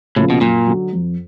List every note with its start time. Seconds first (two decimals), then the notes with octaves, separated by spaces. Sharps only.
0.16 A2 C#3 F3 A#3
0.30 B2
0.41 F#2 A#2
0.67 D3 F#3
0.93 F2